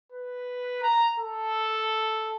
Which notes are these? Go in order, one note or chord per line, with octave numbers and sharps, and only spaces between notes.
B4
A#5
A4